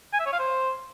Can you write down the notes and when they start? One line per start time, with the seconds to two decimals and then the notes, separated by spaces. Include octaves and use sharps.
0.13 G#5
0.20 E5
0.26 C#5
0.33 F5
0.39 C5